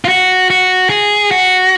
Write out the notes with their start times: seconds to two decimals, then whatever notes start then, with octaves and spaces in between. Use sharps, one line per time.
0.05 F4
0.08 F#4
0.50 F#4
0.90 G#4
1.31 F#4